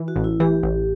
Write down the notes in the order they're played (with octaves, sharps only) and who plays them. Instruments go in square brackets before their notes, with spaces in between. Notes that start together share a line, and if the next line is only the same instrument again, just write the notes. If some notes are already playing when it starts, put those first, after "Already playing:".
Already playing: [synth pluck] E3
[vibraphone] F#4
[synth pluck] A1
[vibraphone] E4
[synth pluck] E3 [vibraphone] G4
[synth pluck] A1